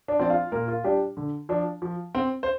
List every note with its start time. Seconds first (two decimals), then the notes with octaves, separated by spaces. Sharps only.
0.08 D4 D5
0.19 F3 C4 D5
0.30 F4 F5
0.52 A#2 A#3 A#4
0.68 F4
0.84 G3 D4 G4
1.17 D3
1.49 F3 D4
1.82 F3
2.15 C4
2.43 C5